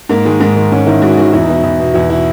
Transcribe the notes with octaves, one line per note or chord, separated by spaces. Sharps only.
G#2 A#3
D#3 G#3
G#2 A#3
D#3
G#2 C#4
D#3 E4
G#2 F#4
D#3 F#4
E2 E4
D#4
B2 E4
E2
B2
E2 E4
B2 E4